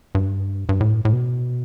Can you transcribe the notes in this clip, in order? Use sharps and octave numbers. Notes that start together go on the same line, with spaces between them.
G2
G2
A2
A2
B2